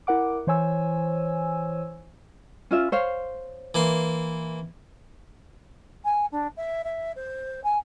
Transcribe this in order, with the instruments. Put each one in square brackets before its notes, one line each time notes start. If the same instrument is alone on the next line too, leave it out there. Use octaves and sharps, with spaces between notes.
[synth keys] E4 A#4 F#5 D6
E3 C5 C#5 G#5 E6
[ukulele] C#4 F4 E5
C5 C#5 F5
[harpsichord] E3 A#3 C6
[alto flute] G#5
D4
E5
E5
C5
G#5